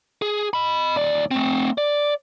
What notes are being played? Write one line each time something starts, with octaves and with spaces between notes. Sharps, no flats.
G#4
D#5 B5
D#2 D5
A3 C4
D5